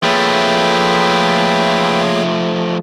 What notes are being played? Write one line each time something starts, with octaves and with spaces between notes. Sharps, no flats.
F3 A3 A#3 G#4 B4 C#5 E5 G5